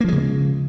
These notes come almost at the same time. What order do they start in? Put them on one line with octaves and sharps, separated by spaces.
A#3 F3 G#3 C#3